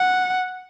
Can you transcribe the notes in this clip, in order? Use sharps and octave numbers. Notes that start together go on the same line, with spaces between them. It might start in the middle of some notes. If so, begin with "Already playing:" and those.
Already playing: F#5